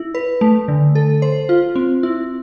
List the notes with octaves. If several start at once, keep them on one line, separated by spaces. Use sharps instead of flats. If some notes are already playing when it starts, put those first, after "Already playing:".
Already playing: E4
B4
A3
D3
A4
C5
F4
C4
E4